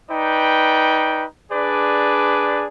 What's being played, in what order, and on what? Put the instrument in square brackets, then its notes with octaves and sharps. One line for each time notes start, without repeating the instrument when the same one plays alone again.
[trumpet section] D#4 B4 D5 G5
D4 G#4 B4 D5